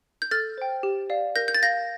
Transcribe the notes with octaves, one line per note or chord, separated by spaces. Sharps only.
G6
A4 F6 A6
C5 G5
G4
D5 F5
A#4 G6 A#6
G6
A6
F5 G6 A#6